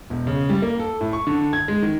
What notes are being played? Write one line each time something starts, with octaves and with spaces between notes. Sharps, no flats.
E1
C#3
G3
A#3
A4
A2
C#6
D3
G#6
G#3
D#3